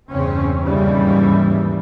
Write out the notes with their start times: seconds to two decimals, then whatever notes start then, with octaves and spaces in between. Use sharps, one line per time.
0.11 E2 G2 C#3 C4 C#4
0.63 D#2 G#2 C#3 E3 G3